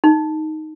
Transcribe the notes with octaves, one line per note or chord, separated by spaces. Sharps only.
D#4